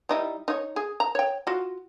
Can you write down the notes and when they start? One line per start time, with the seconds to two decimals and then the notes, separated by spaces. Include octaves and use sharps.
0.09 G3 D#4 E4
0.48 D#4 C#5
0.76 G#4
1.00 A#5
1.15 C#5 G5
1.47 F4 F#4